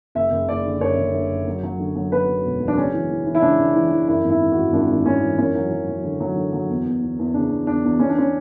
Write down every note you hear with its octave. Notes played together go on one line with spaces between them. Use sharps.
F#1 E5
F#1
F#1 D5
D3
F#2 C#5
F#1
D3
F#2
F#3
F#3
D3
F#3
F#3 B4
F#3
E1
F#3
D4
C#3 C#4
E3
E3
E3
E4
C#2 D4
C#2
E3
E3
F#2 E4
G#1
E4
E3
G#1 F#4
G#1 D4
G#1
G#1 C#4
E3
F#2 C#4
F#3
F#3
F#3
D3
F#3
D3
F#3
E2
E2
E2
E2
C#3 D4
E2
E2 D4
E2
E2 C#4
D4
C#4